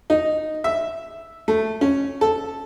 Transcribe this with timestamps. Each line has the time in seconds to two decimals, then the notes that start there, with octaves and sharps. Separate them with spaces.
0.10 D#4
0.64 E5
1.48 A3
1.81 C#4
2.21 A4